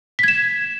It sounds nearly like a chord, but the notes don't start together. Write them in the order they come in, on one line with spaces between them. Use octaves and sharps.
B6 G#6 E7